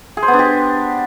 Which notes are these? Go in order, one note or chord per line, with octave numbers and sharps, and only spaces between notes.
G#4
C5
B3
D4
G4